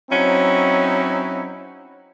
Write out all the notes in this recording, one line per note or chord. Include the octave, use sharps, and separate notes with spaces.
F#3 C4 C#4 D#4 E4